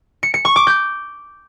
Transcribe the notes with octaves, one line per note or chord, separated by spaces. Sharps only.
C#7
C#7
C#6
D6
G6